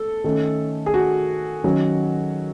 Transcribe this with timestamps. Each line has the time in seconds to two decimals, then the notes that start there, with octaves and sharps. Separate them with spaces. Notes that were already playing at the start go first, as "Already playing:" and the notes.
Already playing: A3 A4
0.24 D#3 A3 C#4
0.86 G#4
0.94 F#4
1.64 D#3 F#3 C#4